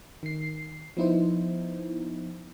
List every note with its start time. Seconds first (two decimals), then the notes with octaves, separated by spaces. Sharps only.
0.23 D#3 C7
0.97 F3 B3 D#4 E4 C5